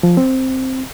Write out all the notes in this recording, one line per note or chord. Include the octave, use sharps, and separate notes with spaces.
F3
C4